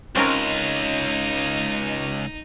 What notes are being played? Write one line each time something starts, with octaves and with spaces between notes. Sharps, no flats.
C#2 C4 C#4 D#4 A#4